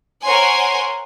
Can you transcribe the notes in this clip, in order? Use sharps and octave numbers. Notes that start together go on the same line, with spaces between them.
A#4 C5 C#5 F#5 G#5 C6